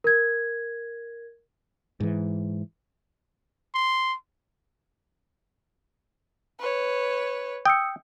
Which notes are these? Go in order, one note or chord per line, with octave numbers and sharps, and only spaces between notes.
A#4 G#6
G#2 E3
C6
B4 C#5
G5 D#6 E6 C#7